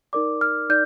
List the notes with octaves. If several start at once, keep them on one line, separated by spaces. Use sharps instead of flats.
D#4 A#4 D5 D6
F6
D#4 D5 G6